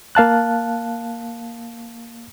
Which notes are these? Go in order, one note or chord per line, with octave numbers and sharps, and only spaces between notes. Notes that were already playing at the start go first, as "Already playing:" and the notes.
A#3 F5 A5 F#6